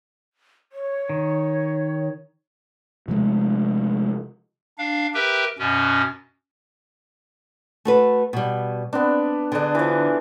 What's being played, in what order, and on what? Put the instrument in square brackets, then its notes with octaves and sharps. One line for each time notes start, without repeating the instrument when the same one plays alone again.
[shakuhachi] C#5
[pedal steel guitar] D#3
[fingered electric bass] C3 F3 G#3 A3
[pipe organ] D4 F5
G4 A#4 B4 E5 G5
F#2 B2 C#4
[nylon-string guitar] A3 F#4 B4
B2 G3
[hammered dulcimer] B3 D4 [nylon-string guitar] C4
[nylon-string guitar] D3 [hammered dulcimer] D4 G#4
[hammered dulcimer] E3 F3